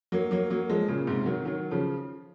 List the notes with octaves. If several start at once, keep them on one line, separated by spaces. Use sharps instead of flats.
F#3 A#3
F#3 A#3
F#3 A#3
F3 G#3
A#2 C#3
G#2 C3
D#3 F#3
D#3 F#3
C#3 F3